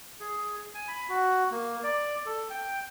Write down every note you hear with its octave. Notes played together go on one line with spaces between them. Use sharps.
G#4
G#5
B5
F#4
A#3
D5
A4
G5